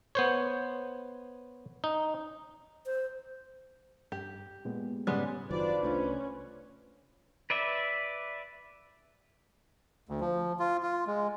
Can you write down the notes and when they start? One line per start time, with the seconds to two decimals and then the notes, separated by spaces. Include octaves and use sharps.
0.15 B3 C5 C#5
1.84 D#4
2.86 C5
4.12 G2 G4
4.65 A#2 G#3 B3
5.07 G#2 C#3 G3 G#3 B3 C#4
5.51 F#1 D#3 F#3 D4 F4 B4 C5 D5
5.83 C2 A3 C#4 D4
7.50 B4 D5 E5
10.09 D2
10.20 F3
10.59 F4
10.83 F4
11.07 G#3